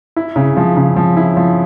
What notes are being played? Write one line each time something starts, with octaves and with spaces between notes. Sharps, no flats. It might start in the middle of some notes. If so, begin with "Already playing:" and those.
E4
C#3
F3
C#3
F3
E4
F3